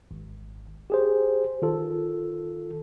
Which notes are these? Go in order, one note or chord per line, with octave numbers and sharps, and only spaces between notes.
G#1
G4 G#4 C5
D#3 F4 A4